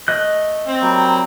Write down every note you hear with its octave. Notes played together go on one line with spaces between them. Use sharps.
A3 D#5 F#6
C4
F#3 G3 A#3